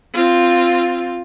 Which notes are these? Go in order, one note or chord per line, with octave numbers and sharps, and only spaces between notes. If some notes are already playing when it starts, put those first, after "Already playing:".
C4 F4